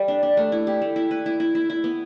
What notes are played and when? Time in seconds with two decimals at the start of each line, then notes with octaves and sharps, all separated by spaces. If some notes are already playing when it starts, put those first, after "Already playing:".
Already playing: G3 A4
0.08 D4
0.23 D4
0.37 A3
0.52 E4
0.67 G4
0.82 A3
0.96 E4
1.11 B4
1.26 E4
1.40 E4
1.55 E4
1.70 E4
1.84 B3